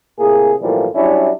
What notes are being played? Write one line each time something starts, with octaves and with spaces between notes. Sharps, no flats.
A2 C3 A#3 G#4
B1 A2 E3 F3 G3 A#3
F#3 G3 C#4 D4 E4